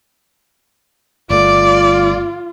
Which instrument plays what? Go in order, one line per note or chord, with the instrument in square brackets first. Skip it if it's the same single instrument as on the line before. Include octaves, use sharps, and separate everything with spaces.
[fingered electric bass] G1 A3 [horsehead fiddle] F4 [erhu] D5